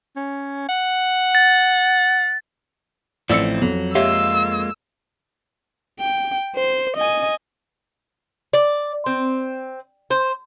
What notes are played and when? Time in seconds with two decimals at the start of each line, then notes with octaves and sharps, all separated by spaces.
0.16 C#4
0.69 F#5
1.35 A6
3.30 A1 F3 A3 C4 D5 E6 C#7
3.62 F2 F#3
3.95 G#3 A#3 F4 G4 C#5 E5 E6
5.99 G5
6.56 C5
6.97 D#5 G#5
8.53 D5
9.06 C4
10.11 C5